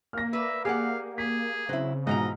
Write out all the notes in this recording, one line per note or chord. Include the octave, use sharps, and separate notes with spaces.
A#3 F6 A#6
B4 D5 E5
G4 G#4 D5 F5 F#5
G#4 B6
C#3 F#3 C4 E4
G#2 B2 E3 F3 D#5 A#5